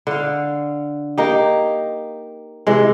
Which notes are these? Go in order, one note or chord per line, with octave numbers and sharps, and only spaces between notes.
D3 F5
A#3 D#4 G4
C3 E3 G#3